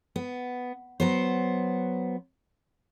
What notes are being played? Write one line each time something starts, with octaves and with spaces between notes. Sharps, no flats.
B3
F#3 B3 C5